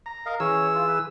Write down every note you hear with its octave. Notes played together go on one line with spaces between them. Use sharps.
A#5
A#4 D#5 F5
E3 C#4 G#4 C#5 E6
F4
B4